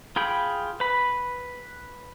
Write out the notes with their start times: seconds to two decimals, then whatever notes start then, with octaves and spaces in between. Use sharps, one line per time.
0.16 F4 G#4 G5 B5
0.80 B4 B5